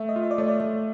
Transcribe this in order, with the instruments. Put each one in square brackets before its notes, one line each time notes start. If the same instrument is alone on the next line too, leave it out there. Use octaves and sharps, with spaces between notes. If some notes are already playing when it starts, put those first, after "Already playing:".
Already playing: [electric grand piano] A3 [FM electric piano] E5
[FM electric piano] D#5
[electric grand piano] F4
[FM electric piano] D#5
D5
[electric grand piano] A3 [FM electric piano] C#5
[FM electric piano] D5
[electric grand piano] A3